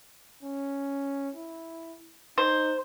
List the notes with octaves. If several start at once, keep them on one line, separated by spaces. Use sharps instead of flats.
C#4
E4
D#4 C5